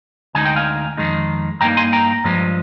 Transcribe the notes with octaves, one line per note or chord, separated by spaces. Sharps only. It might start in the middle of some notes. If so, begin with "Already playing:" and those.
D2 D3 G#3 D#4 G#5
G5
F5 G#5
F2 D#3 G#3 D#4
G2 D#3 A#3 D#4 G5 A#5
G#5 C6
G5 A#5
G2 F3 G#3